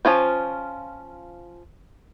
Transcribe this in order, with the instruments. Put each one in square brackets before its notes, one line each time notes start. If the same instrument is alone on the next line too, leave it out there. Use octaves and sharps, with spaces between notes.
[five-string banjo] F3 C#4 F4 C5